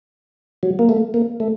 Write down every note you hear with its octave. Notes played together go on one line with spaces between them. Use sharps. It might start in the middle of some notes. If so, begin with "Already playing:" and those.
F#3
A#3
A3
A#3
A3